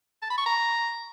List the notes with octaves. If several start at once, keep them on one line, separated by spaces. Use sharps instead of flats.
A5
B5
C#6
A#5